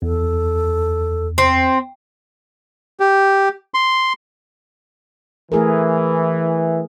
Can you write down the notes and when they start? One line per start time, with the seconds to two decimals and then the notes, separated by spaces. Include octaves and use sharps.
0.02 E2 A4
1.38 C4
3.00 G4
3.74 C6
5.52 E3 A3 G#4 A#4